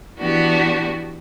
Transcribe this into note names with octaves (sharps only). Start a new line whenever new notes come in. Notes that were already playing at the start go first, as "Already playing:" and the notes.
E3 B3 D4 F#4 G4